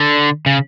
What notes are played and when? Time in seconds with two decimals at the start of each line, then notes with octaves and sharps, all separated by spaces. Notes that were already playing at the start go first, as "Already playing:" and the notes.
Already playing: D3
0.46 C#3